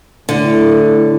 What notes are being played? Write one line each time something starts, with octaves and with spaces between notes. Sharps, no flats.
A2 D3 E4